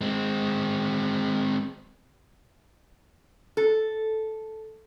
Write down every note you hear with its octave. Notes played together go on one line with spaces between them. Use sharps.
G#3 C4
A4